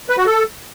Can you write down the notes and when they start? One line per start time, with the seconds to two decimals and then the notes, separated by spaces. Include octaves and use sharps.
0.09 B4
0.17 F#4
0.26 A4